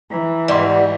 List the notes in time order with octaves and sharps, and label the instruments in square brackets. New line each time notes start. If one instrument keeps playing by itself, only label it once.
[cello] E3 [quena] A#5
[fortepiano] G#1 C6 [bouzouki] G3 [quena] F#5